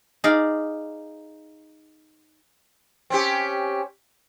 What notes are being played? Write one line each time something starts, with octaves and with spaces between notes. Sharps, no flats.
D#4 G#4 D5 F5
C4 C#4 G4